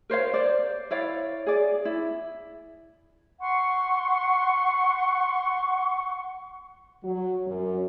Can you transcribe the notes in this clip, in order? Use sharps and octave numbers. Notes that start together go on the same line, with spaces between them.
A#4 C5 C#5 F5
C5 D5
E4 C#5 D5 F5
G#4 D5
E4
F#5 C6 C#6
F#3
F#2